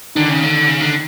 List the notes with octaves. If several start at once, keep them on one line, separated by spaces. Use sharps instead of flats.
D3 D#3
C#3
D3
C#3
D3